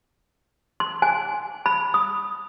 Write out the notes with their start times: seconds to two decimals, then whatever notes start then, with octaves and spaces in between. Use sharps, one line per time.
0.80 C6
1.02 G#5
1.66 B5
1.94 D#6